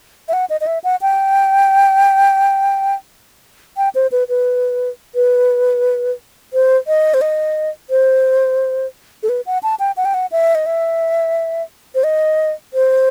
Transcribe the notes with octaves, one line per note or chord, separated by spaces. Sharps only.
E5
F#5
D#5
D#5
E5
F#5
G5
G5
C5
B4
B4
B4
C5
D#5
C5
D#5
C5
A4
B4
F#5
A5
G5
F#5
G5
F#5
E5
D#5
E5
C5
D#5
C5